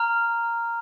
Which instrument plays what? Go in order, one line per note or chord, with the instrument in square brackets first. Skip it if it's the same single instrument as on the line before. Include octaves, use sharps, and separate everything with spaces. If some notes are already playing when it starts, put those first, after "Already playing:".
Already playing: [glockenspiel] A#5 F6